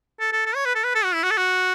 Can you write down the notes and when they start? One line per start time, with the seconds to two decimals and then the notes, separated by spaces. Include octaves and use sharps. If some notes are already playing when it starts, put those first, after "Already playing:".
0.20 A4
0.33 A4
0.46 A4
0.55 C#5
0.65 B4
0.75 A4
0.84 B4
0.95 A4
1.04 F#4
1.14 E4
1.23 F#4
1.30 A4
1.37 F#4